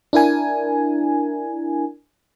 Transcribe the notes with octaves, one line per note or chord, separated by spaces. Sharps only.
D4 E4 A#4 G#5